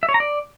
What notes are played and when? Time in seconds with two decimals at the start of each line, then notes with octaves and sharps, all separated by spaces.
0.03 E5
0.09 C#5
0.14 A#5
0.20 D5